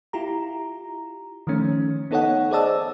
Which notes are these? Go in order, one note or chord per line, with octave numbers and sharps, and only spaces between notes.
E4 F4 G4 A#5
D#3 F3 A3 C#4
B3 D#4 A4 C#5 D#5 F#5
G#4 C5 D5 D#5 A5 E6